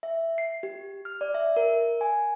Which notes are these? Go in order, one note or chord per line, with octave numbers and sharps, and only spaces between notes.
E5
C7
G4
F6
D5
E5
A#4
G#5